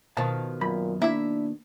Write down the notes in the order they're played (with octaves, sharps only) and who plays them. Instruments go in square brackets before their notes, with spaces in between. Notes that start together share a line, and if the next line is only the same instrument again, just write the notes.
[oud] B2 D#3 [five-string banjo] F3 [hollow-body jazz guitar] A5
[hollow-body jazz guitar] F#2 B5 [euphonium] A#2
[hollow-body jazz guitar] A#3 [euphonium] D4 [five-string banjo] E4 E5